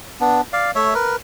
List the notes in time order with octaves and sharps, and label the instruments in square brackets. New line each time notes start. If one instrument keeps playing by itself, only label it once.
[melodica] B3 D4
D5 F5
A3 C#5 E5
A#4 B4